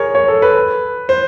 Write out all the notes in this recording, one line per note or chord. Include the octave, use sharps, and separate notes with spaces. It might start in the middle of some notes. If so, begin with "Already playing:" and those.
Already playing: G#4 A#4 C#5
C#5
A4
B4
C5